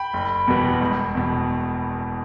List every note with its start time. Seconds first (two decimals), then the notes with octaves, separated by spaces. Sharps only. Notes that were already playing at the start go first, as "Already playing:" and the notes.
Already playing: G5 B5
0.13 F#1
0.47 E2 B2 G3 B3
0.81 E1
1.15 E2 B2